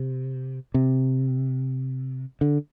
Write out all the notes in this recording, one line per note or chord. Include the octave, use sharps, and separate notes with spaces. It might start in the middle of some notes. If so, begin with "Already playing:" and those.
Already playing: C3
C3
D3